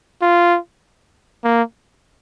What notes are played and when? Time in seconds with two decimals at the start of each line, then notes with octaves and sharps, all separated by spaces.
0.22 F4
1.44 A#3